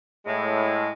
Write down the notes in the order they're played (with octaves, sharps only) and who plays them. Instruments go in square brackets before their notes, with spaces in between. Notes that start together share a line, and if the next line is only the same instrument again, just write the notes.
[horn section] A2 G#3